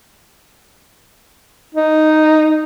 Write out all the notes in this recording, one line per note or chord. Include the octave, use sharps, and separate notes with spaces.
D#4